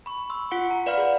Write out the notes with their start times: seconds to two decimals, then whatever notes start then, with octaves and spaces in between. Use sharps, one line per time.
0.06 B5 C#6
0.30 C6 C#6 E6
0.51 F4 F#5 C#7
0.71 A#5
0.86 B4 D5 F5 F#5 B5 F6
0.98 G#4 D5